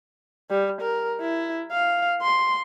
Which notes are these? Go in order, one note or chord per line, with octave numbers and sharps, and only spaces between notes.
G3
A#4
E4
F5
C6